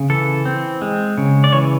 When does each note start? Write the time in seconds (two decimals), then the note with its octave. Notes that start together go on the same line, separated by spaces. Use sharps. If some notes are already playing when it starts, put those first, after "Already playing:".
Already playing: C#3
0.10 E3 A4
0.45 C4
0.82 G#3
1.17 C#3
1.44 D5
1.52 E3 C#5